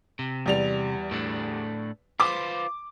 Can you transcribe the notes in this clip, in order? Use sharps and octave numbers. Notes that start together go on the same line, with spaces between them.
C3
E2 G3 F7
A2 A3 D4
F4 B4 C5 D6